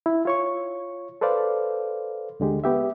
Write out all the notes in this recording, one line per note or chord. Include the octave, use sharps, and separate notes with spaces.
E4
F4 C#5 C#6
A4 B4 C5 D5 F5
D2 D3 G#3 G4
B3 G4 E5